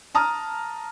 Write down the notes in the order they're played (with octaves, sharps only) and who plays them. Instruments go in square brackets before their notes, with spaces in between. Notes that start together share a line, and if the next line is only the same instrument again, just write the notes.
[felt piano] A5 A#5 D#6 F6